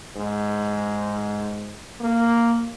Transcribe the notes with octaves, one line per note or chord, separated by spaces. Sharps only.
G#2
A#3